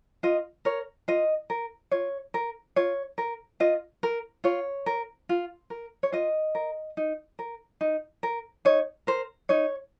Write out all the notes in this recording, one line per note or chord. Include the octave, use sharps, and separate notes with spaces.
F4 D#5
A#4 C#5
F4 D#5
A#4
F4 C#5
A#4
F4 C#5
A#4
F4 D#5
A#4
F4 C#5
A#4
F4
A#4
C#5
F4 D#5
A#4
D#4
A#4
D#4
A#4
D#4 C#5
A#4 C5
D#4 C#5